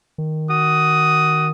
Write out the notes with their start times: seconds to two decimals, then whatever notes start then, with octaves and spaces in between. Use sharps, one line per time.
0.18 D#3
0.51 F#4 D#6